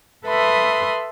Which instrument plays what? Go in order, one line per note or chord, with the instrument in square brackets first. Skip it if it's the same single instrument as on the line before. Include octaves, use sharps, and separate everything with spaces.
[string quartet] A4 B4 E5 B5 C6 D#6